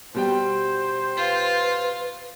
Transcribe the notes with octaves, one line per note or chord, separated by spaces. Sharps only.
B2 G3 C5 G5
F4 B4